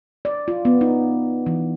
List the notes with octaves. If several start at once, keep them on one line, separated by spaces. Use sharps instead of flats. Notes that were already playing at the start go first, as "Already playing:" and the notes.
D5
F4
B3
D#4
E3